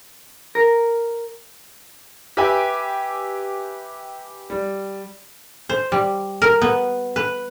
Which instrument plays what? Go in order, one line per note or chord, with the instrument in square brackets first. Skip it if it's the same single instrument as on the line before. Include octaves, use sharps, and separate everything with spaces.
[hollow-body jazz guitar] A#4
[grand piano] G4 B4 E5 G5 G#5
G3
[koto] C5
G3
A#4
B3
B4